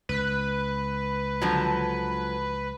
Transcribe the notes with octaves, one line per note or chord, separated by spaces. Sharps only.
C#2 B4
D3 F3 F#3